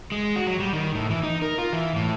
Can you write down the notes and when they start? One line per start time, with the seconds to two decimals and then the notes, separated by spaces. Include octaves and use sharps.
0.12 G#3
0.36 F#4
0.47 F#3
0.60 G3
0.73 D#3
0.95 A2
1.10 E3
1.23 D#4
1.42 A#4
1.58 F4
1.73 E3
1.96 A2